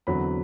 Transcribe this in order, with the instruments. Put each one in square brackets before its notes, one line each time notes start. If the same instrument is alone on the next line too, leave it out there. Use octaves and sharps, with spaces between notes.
[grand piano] E2 D3 F#3 C4 B5